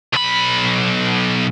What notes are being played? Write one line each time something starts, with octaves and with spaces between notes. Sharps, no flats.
B1 B5